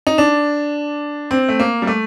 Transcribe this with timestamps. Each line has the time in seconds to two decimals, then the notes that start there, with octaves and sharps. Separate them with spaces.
0.07 D#4
0.18 D4
1.31 C4
1.48 A3
1.60 A#3
1.82 G3
1.87 A3